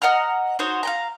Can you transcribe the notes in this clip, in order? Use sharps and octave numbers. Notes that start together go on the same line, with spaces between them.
D#5 F#5 A#5 F6
D#4 F#4 C5 C#5
F5 G5 A#5